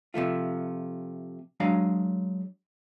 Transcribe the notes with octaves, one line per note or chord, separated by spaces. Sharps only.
C3 F3 A3 F4
F#3 G#3 D4 F5 A#5